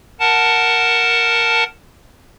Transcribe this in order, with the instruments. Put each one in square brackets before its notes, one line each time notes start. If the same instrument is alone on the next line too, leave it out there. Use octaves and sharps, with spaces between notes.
[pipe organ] A#4 F#5 A5